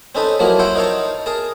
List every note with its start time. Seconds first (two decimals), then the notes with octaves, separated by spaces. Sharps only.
0.15 C4 C#4 D#4 A4 B4
0.39 F3 F#3 A#3 E4 A#4
0.59 C5 C#5 E5 F#5 G5 B5
0.75 D#4 A#4 C#5 F5 A5
1.26 G#4 A#4 A5